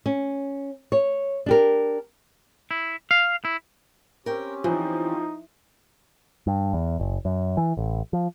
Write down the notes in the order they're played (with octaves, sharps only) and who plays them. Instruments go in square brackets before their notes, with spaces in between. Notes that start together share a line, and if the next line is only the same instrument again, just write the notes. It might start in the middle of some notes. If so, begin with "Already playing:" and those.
[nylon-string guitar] C#4
C#5
D4 G4 A#4
[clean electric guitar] E4
F5
E4
[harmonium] C4 C#4 G4 [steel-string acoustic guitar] A#4 G5
[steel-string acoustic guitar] E3 [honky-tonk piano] F3 [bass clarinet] D#4
[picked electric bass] G2
E2
F#1
F#2
E3
A1
F3